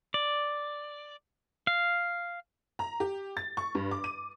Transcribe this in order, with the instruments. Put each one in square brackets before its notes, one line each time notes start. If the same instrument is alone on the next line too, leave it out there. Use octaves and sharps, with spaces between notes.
[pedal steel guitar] D5
F5
[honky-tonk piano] A#5
G4
A6
C#6
G2
D6
D#7